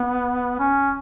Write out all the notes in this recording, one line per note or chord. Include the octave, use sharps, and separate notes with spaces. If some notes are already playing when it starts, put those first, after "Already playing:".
Already playing: B3
C#4